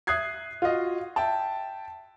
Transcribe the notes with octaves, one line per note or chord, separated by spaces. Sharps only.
E5 D#6 F#6 G#6 C7
F4 F#4 D#5
E5 G5 A5